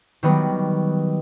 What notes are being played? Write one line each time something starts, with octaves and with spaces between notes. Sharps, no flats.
D#3 F#3 G3 B3